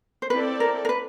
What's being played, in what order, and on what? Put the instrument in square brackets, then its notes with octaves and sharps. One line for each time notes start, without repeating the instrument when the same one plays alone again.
[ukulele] C5
[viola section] C4 E4 A4 D5 [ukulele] B4
[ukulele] A#4
A#4
B4